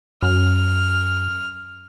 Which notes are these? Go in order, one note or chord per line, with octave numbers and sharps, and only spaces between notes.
F#2 F6